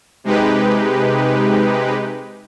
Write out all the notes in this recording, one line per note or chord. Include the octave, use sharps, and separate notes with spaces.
C3 G#3 D#4 G4 B4